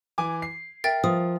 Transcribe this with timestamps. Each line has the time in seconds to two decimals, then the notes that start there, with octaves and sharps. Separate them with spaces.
0.18 E3 G#5 D6
0.42 C7
0.84 A#4 E5 G5 A6
1.04 F3 D#6